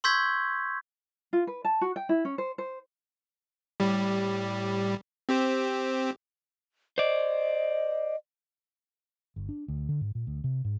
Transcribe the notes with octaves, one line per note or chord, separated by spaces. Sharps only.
C6 C#6 E6 G6 G#6 B6
F4
B4
A5
F#4
G5
E4
C#4
C5
C5
A2 G3 G4
C4 G4 C5
C5 D5 D#5
G1
D4
D2
D3
G#2
A#2
D2
C3
G#2